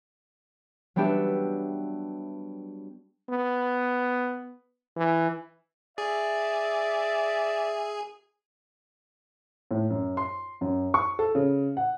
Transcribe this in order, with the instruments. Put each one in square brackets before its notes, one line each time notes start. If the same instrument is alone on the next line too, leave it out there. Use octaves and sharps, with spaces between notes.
[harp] F#3 G3 B3 D4 G4 E5
[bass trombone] B3
E3
[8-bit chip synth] G#4 [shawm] D5 [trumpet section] E5
[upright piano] A2
F#2
C6
F#2
C#6
A4
C#3
F#5